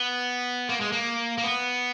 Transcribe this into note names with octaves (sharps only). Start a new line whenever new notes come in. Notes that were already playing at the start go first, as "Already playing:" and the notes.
Already playing: B3
A#3
G#3
A#3
A#3
B3